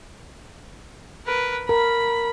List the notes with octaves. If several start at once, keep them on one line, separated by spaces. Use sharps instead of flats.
A#4 B4
A#4 B5